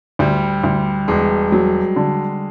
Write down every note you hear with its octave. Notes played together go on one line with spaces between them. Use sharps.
D2 G3
D2
E1 G#3
F#3
D3